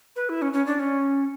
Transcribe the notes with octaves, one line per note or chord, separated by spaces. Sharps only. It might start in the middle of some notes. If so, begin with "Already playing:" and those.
B4
E4
C#4
C#4
D4
C#4